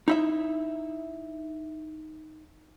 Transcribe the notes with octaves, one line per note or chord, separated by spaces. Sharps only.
D#4 E4 E5